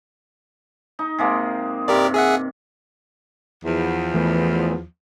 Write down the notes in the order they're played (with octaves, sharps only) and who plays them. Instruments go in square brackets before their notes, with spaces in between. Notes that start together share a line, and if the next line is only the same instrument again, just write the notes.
[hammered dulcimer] D#4
C3 G#3 A#3
[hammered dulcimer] G2 C3 [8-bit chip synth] G4 A#4 D5
[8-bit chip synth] G#4 E5 F#5
[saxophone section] E2 F3
[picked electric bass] E3 A3 B3